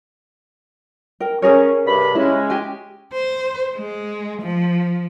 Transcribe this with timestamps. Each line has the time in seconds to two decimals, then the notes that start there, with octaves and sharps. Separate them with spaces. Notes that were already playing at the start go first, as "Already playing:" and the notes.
1.20 A#4 G5
1.42 C#4 G#4 A#4 C#5
1.87 G2 C3 B5
2.15 C#3 G#3 C#4 E4
2.50 G4 G#5
3.13 C5
3.76 G#3
4.42 F3